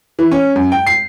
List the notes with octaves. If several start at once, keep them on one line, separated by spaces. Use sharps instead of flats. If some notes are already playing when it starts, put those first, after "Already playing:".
E3
C#4
F#2
G5
C7